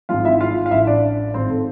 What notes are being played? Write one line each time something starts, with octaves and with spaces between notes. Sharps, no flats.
G#1 G#2 F3 F4 F5
E4 E5
F4 F5
F5
A1 A2 F3 E4 E5
D4 D5
G#1 G#2 F3 C4 C5
A4